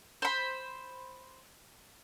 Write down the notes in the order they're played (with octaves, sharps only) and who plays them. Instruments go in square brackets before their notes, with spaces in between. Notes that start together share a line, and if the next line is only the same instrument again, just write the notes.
[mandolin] C5 B5